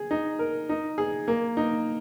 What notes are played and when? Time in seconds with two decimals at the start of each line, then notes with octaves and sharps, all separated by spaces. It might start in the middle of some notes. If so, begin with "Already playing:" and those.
Already playing: G#4
0.11 D#4
0.39 A#4
0.69 D#4
0.98 G#4
1.28 A#3
1.57 D#4